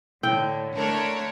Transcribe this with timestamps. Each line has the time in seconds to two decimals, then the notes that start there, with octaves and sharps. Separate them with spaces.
0.23 A2 D3 E4 G5
0.76 D3 A3 D4 A#4 C#5